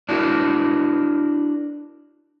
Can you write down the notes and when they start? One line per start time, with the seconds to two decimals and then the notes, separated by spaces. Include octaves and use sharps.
0.09 D4 E4 F#4 A4 A#4